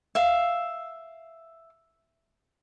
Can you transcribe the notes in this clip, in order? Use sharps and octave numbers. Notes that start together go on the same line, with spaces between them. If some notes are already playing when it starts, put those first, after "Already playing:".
E5 F5